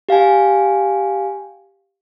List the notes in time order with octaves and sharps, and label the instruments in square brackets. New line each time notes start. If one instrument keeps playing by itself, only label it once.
[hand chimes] G4 F5 G5 G#5